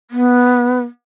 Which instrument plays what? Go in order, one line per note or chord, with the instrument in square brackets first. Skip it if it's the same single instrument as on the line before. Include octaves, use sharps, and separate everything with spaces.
[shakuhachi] B3